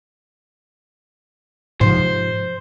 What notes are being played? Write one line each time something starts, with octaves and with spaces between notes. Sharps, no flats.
G#2 C3 F3 C5